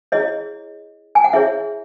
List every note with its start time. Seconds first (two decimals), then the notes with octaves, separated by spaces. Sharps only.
0.12 E4 G#4 C#5 D#5
1.15 G#5
1.24 F#5
1.33 E4 G#4 C#5 E5